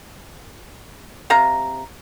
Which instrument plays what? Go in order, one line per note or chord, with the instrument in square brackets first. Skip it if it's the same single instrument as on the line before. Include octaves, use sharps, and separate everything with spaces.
[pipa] C3 F5 A#5